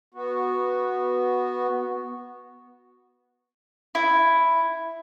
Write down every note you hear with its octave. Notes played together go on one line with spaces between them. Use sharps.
B3 F#4
E4